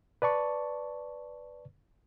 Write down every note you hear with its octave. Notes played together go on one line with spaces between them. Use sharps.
B4 D5 A5 C#6